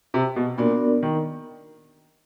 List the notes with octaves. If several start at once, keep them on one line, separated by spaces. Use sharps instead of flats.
C3
B2
A#2 B3 D4 F#4 A#4 D5
D#3